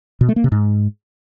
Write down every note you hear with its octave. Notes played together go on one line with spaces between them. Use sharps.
B2
A3
A#3
C3
G#2